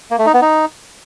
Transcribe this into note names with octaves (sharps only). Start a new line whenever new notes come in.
A#3
A3
D#4
B3
D#4